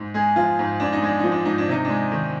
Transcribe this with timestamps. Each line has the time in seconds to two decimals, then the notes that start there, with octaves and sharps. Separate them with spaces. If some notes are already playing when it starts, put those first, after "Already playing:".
Already playing: G#2
0.14 G#3 G#4
0.36 F3 F4
0.59 G#2
0.80 G#2 D4
0.93 D#4
1.02 G#3 D4
1.19 F3 D#4
1.32 D4
1.45 G#2 D#4
1.58 D4
1.68 C3 D#4
1.85 G#3 D4
2.12 D#3